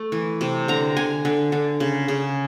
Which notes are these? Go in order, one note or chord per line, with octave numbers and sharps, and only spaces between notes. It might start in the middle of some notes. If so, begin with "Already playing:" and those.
Already playing: A3
E3
C3
D3 A#5
D3 G#5
D3
D3
C#3
C#3